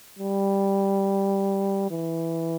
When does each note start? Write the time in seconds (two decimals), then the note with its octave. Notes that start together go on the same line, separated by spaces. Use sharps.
0.19 G3
1.91 E3